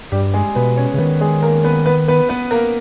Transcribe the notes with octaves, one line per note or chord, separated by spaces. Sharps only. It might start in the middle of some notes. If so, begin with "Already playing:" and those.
G2 G3 G4
G#3 G#4
B2 B3 B4
C#4 C#5
C#3
D#3 B3 B4
G#3 G#4
A#3 A#4
B3 B4
B3 B4
B3 B4
B3 B4
A#3 A#4